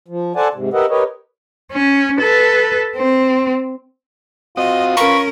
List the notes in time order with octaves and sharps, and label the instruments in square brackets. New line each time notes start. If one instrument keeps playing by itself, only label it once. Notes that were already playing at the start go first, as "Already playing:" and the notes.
[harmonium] F3
A4 C5 D5 F#5 G#5 A5
G#2 C3
G4 A#4 B4 D#5 E5 F#5
G4 A#4 B4 C#5 D#5
[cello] C#4
A4 B4
C4
[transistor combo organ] C4 F#4 D#6 [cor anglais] F4 [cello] D#5
[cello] C#4 A#4 [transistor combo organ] B4 A#5 B5 [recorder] C#6